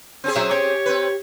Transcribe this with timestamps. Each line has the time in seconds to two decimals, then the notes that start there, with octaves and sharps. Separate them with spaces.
0.24 C4 C#4 G#4
0.35 F#3 E5
0.51 G4 C#5
0.86 C4 B4